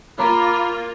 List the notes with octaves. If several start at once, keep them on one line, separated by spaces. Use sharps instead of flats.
A#3 F4 C#5 A#5 B5 D6